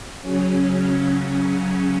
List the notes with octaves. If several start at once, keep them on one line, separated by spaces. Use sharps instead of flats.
C#3 F#3 C#4